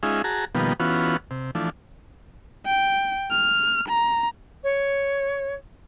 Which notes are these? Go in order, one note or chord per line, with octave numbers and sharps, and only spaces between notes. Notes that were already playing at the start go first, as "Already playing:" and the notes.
G#3 C#4 D#4 F4 G#4 E5
F#4 G#4 A5 A#5
B2 D#3 F3 G3 A#3 B3
E3 B3 C#4 F4 F#4
C3
E3 F3 A3 D4
G5
F6
A#5
C#5